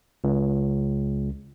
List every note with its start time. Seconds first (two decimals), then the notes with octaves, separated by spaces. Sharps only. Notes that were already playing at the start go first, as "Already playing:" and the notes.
0.24 C#2